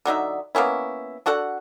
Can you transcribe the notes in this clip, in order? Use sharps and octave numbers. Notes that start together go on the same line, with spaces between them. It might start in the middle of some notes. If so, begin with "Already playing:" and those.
D3 F#3 D#4 E5
A#3 B3 C#4 E4
D4 F#4 A4 F#5